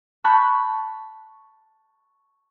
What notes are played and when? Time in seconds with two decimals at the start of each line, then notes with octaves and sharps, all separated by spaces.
0.24 A5 B5 C#6 F#6 G6